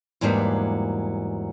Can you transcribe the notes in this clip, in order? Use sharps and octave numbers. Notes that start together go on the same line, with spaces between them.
E2 G#2 F#3 G3 A#3 D4